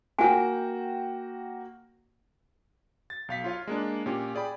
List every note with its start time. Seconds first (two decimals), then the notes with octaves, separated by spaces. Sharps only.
0.19 A#3 F#4 G5 G#5
3.10 A6
3.28 B1 F5 B6
3.44 F4 C#5 F5
3.67 G#3 A#3 D4
4.06 A#2 C#4 G4
4.35 G#4 D5 G5 B5